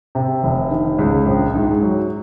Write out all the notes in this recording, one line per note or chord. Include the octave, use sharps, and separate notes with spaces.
C3
F1
D#3
C#2
A#1
G#2
F#3